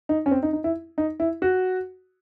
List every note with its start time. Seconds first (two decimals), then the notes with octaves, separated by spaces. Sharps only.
0.09 D#4
0.26 C#4
0.31 C4
0.43 D#4
0.53 D#4
0.64 E4
0.98 D#4
1.20 E4
1.42 F#4